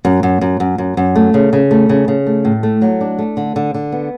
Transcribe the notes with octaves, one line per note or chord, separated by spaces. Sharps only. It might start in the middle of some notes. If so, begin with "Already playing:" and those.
F#2
F#2
F#2
F#2
F#2
F#2
A3
C#3
C#3
A3
C#3
C#3
A3
A2
A3
F#3
D4
A3
D3
D3
D3
B3